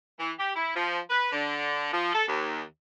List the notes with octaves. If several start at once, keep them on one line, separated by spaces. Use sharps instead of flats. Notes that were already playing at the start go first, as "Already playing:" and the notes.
E3
G4
E4
F3
B4
D3
F3
A4
D#2